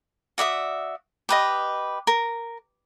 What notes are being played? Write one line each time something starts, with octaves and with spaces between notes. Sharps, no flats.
F#4 D5 E5 D#6
G4 B4 D#5
A#4